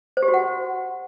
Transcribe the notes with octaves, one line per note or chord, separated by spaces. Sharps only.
C5
G4
F#4
F#5